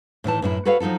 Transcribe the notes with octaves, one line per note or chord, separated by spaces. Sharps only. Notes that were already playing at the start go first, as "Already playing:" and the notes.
A2 D#3 E3 A5
F#2 A2 E4
F#4 A4 B4 C#5 F5
F3 F#3 D#4 F4 A4